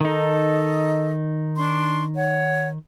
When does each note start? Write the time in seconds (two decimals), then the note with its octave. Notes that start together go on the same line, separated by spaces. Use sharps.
0.01 D#3 D#4 A4 D#5
1.55 D4 C6 C#6
2.15 C#5 F#5